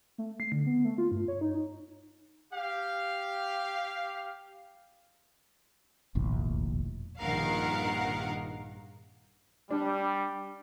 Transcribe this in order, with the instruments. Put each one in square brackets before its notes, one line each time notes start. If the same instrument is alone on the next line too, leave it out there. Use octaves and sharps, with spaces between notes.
[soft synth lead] A3
C7
D3
B3
A3
F4
G2
C#5
D#4
[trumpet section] G4 F5
[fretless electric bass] E1 A#1 D#2 A2
[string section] A#1 G2 D#3 A#4 F5 F#5
[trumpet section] G3 [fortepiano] D4